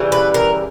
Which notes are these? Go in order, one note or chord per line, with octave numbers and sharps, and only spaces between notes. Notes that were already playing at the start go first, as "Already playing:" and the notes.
Already playing: C#3 E3 G3
B4
A#4